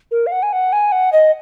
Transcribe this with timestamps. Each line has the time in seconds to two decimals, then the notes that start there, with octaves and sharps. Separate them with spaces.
0.11 A#4
0.27 F5
0.32 F#5
0.43 G#5
0.53 F#5
0.72 G#5
0.92 F#5
1.13 D#5